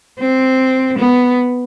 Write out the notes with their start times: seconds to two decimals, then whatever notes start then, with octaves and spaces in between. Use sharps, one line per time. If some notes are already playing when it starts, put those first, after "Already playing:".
0.20 C4
0.99 B3